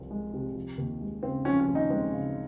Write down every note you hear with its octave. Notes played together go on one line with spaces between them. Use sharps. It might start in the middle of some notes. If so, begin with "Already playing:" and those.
Already playing: C2 C3 F3
G#3
C3
F3
D#2
G#3
C#3 C4
F3 C#4
C#4
D#2
D#4
G#3 C4
C#3